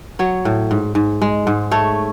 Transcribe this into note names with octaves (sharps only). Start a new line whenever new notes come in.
F#3 C#5
A2
G#2
G#2
G#3
G#2
A3 C#5